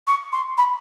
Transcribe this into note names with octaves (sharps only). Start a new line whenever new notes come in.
C#6
C6
B5